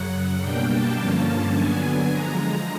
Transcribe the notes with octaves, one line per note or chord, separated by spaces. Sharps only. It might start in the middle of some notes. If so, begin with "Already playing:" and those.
Already playing: F#2 C#3 F#3 F#5
F#5
B2 G3 A#3 D4 G5
A5
G2 D3 F3 A#3 C#4 A5
D3 F#3 B3 D4 G#5
D3 F3 G#3 A#5